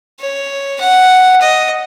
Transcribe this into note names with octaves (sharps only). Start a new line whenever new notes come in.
C#5
F#5
D#5